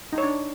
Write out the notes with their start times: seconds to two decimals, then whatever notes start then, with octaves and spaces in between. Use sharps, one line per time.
0.13 D#4
0.18 C#5
0.23 D4